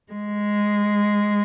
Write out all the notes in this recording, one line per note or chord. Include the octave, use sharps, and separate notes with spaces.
G#3